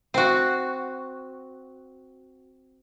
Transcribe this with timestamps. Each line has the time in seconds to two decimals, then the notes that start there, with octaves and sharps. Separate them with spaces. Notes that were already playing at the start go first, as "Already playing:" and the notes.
0.14 C4 F#4